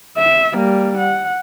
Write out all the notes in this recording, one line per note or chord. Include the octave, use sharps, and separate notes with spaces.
E5
G3 A#3
F#5